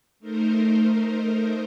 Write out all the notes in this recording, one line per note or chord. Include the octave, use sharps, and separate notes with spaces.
A3 D#4 A#4 C5